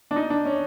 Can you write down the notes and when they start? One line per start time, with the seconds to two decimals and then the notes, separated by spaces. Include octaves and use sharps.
0.11 D4
0.16 D#4
0.30 D4
0.45 C#4